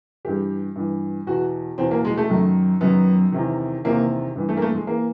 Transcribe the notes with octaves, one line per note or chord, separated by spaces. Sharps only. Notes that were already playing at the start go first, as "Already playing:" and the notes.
G2 E3 G4
G2 E3
E2 B2 F#4
E2 B2 C4
A#3
G#3
A3
F#2 D#3
F#2 D#3 B3
E2 C3 D#3
E2 C3 D#3 A#3
G2 E3
A3
A#3
A3
G#3
E3 A#3